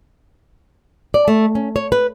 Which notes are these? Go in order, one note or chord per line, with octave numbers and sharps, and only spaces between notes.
D5
A3
C#4
C#5
B4